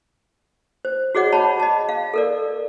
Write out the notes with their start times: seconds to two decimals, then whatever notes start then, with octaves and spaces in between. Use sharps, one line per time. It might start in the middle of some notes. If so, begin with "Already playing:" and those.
0.85 C5
1.15 F#4 G#4 C#5 D#5 F#5
1.33 C#5 A5 B5
1.60 D#5 A5
1.89 F5
2.14 A4 A#4 D5